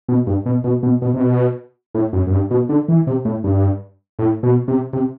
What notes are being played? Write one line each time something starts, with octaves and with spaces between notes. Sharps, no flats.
B2
G2
B2
B2
B2
B2
C3
B2
A2
F#2
F#2
G2
B2
D3
E3
C3
A2
G2
A2
B2
C3
C3